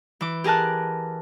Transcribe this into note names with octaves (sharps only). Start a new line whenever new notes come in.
E3 D6
G4 G#4 A#4 A5 F#6